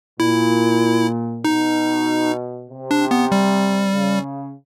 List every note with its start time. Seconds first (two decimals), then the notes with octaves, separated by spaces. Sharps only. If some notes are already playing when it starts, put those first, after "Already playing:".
0.19 A#2 E4
1.44 B2 D#4
2.70 C3
2.91 D4
3.11 B3
3.32 G3
3.94 C#3